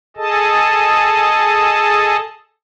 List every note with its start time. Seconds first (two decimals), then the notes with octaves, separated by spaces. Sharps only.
0.17 G#4 A4 D#5 A5